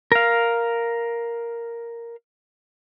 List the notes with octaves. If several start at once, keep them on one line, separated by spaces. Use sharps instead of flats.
A#4 F5